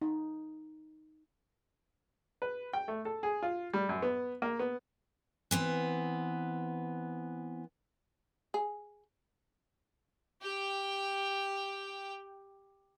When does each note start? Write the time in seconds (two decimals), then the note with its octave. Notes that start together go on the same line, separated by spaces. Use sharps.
0.02 D#4
2.42 B4
2.73 G5
2.88 A3
3.05 A4
3.23 G#4
3.43 F4
3.74 G3
3.89 F#2
4.02 B3
4.42 A#3
4.59 B3
5.51 E3 B3 C4
8.54 G#4
10.42 G4 G5